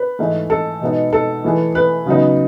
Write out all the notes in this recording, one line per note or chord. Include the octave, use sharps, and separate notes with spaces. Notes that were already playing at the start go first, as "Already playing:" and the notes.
Already playing: B4
G#2 E3 A3 D#4 G#4
A4
B2 G#3 B3 D#4
A4
E3 A3 E4 G#4 B4
B4
C#3 F#3 B3 D#4